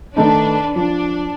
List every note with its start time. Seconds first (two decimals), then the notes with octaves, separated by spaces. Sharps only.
0.17 D#3 A3 D4 D#4 B4
0.76 F3 D4